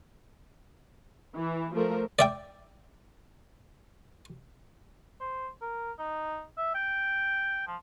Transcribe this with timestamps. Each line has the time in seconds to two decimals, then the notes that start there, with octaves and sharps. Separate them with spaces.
1.36 E3
1.75 F3 A3 A#4
2.19 D5 E5 G5
5.20 C5
5.61 A#4
5.99 D#4
6.57 E5
6.75 G5
7.68 F3